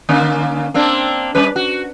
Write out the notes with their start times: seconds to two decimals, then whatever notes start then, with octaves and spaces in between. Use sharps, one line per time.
0.09 D3 A#3 C#4
0.74 A#3 C4 D4
1.35 G3 C#4 B4
1.56 F#4